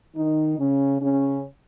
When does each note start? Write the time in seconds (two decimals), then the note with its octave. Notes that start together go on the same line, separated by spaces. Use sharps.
0.16 D#3 D#4
0.59 C#3 C#4
1.01 C#3 C#4